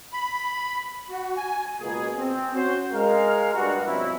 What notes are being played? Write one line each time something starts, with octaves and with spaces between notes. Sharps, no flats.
B5
F#4
G#5
C#2 B2 A#3 G#4
C4
C#4 F#4 C5
G#3 A#4 F5
G2 F#4
G2 B2 F3 C4 C#4 E4